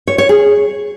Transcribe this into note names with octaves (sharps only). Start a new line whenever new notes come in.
C#5
C#5
G#4